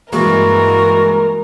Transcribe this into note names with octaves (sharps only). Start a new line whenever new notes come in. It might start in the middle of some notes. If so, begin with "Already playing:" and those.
G2 E3 G#3 A#3 F#4 A#4